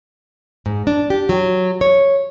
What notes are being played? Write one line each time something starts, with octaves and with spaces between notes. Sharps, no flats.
G#2
D4
G4
F#3
C#5